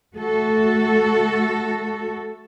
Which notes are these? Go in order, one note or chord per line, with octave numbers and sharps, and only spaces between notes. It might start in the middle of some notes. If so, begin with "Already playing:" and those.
A3 F#4 A4